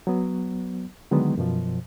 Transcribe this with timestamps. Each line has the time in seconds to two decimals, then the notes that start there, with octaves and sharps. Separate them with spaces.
0.07 F#3 B3
1.11 D3 D#3 F#3 G#3 B3
1.37 F#2 B2 F3